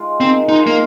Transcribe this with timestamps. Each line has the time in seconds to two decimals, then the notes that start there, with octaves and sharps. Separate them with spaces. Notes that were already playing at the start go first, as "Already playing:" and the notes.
Already playing: G#3 F4
0.20 D#3 C4
0.48 G#3 D#4 F4
0.67 A#3